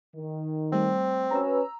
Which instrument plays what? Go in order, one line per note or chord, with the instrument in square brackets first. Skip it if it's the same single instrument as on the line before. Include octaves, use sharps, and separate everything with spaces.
[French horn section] D#3
[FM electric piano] G3 A3 [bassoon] C4
[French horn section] C#4 F#4 B4 [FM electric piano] A#5 E6